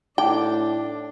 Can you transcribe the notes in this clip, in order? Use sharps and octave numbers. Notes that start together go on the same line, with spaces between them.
A2 D4 D#4 G5 D6